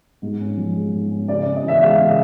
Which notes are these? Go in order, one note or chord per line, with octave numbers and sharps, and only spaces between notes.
G#2
C#4
F3
G#3
G#2
C#4
C#3 D5
D5
C#4
D#5
E3 E5
G#3 F5
C#3
D#5